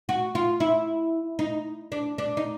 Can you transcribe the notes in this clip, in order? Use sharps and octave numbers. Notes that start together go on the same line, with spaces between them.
F#4
F4
E4
D#4
D4
D4
D#4